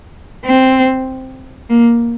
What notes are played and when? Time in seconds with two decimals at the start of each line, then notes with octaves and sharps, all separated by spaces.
0.45 C4
1.70 A#3